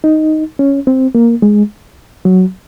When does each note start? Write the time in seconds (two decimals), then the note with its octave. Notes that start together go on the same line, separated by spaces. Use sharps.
0.04 D#4
0.59 C#4
0.87 C4
1.15 A#3
1.42 G#3
2.25 F#3